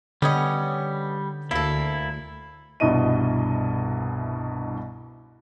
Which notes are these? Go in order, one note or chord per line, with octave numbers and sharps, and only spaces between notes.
D3 G3 B3 C#4 D#5
D2 A#3 E4 A4
C2 G2 B2 E4 D#5 D#7